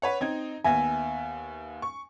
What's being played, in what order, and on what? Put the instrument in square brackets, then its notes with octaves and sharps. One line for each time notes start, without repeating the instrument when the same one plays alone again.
[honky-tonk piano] B4 C#5 F#5
[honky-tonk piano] C4 D#4 [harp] G#6
[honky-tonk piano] D#2 B3 E5 [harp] G#5 A#6
[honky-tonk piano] C#6